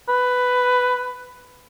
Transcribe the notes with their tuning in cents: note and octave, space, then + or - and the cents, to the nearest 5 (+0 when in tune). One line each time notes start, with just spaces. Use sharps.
B4 +10